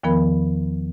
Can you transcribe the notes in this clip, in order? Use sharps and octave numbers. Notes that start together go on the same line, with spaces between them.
E2 D#3 F3 B3 A#4 B5